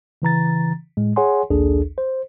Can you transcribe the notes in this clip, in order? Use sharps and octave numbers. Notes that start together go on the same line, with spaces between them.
C#3 E3 A#5 A6
A2 G#3
G#4 C#5 F#5 G#5 C6
A#1 D#2 D4 G#4 A4
C5